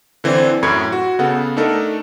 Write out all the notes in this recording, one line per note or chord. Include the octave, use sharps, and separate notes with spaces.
D3 E3 C4 C5 D5
F#2 A2 B5 C#6 G#6
F#4
C#3 B3 A4 F#5
A3 D4 D#4 A4 A#4